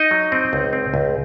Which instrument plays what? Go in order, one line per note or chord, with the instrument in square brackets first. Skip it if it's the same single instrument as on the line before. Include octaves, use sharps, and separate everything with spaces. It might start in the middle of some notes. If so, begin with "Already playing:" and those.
Already playing: [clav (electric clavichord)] D#4 D#5
F#3
C4
C#2
C4
C#2